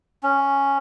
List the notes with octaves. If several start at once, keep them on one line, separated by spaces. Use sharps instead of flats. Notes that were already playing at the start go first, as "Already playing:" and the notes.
C#4